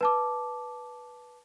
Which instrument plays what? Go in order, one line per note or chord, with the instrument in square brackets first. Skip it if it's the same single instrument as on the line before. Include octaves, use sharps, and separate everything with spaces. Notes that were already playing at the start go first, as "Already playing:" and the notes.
[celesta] B4 A5 D6